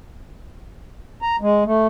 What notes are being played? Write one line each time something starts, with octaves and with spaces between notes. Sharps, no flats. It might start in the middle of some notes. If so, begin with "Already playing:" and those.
A#5
G#3
A3